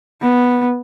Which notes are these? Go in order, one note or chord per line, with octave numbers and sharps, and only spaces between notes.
B3